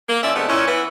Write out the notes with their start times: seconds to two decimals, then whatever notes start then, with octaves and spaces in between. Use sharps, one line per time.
0.09 A#3
0.23 F3 C#4 D5 E5
0.36 C3 F3 G#3 A3 B3 D4
0.49 A#2 C#4 E4
0.68 E3 B3 E4